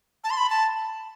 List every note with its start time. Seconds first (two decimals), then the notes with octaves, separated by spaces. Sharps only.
0.24 A5
0.30 C6
0.37 B5
0.50 A5